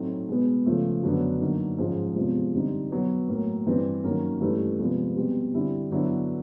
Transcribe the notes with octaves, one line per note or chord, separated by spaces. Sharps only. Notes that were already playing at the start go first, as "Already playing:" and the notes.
Already playing: A2 F#3 A3 C4 D#4
B2 G#3 B3
C#3 F3 A3
F#2 D3 F#3 B3
D3 F#3 A#3 D#4
G#2 F3 G#3 C#4
E2 C3 F3 G#3
D3 G3 C4 D#4
B2 F#3 B3
A2 F#3 A#3
G2 E3 G3 C4
D#3 F#3 A#3 C#4
G2 E3 A3 C#4 E4
E2 C3 F3 G#3 B3
B2 G3 C4
D3 G3 C4 E4
D3 F#3 B3 E4